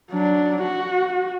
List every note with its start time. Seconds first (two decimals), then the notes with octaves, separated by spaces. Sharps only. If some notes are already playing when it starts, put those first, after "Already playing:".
0.11 F#3 D4
0.62 F#4